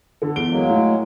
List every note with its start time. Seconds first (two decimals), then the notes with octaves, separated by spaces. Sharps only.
0.22 D3 A4
0.36 E2 D7 G7
0.50 F#3 G#3 A#3
0.69 A2